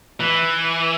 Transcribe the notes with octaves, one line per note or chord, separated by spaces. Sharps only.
E3